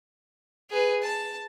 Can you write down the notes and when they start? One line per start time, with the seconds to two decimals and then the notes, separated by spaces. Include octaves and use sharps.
0.70 G#4 B4
1.03 A5